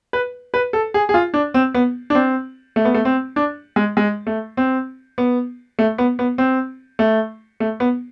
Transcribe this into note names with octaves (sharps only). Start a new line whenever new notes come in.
B4
B4
A4
G#4
G#4
F4
D4
C4
B3
D4
C4
A3
B3
A3
C4
D4
G#3
G#3
A3
C4
B3
A3
B3
B3
C4
A3
A3
B3